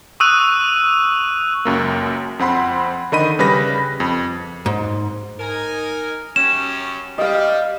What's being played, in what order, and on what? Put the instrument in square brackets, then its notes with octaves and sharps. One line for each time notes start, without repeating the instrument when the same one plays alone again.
[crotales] C#6 D#6 E6 F#6 D#7
[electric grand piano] C#2 F#2 A#3
F2 C4 F#5 B5 C6
D3 D#3 D#5 B5 D#7
C#3 G3 B4 B5 A#6
F2
[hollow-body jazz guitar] G#2
[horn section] D#4 A#4 G#5
[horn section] F#2 C#4 G4 [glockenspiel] E7
[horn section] G3 [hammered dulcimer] D#5 F5